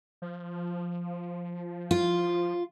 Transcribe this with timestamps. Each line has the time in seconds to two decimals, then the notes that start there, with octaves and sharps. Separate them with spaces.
0.22 F3
1.91 F4